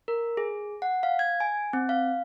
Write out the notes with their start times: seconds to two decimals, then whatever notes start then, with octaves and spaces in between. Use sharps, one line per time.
0.08 A#4
0.37 G#4
0.82 F#5
1.03 F5
1.19 G#6
1.40 G#5
1.73 C4
1.89 F5